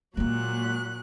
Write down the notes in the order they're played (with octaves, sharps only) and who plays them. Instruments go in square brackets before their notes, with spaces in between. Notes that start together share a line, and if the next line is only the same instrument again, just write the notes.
[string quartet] A#2 F#3 F#6 [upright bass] G#3 A#3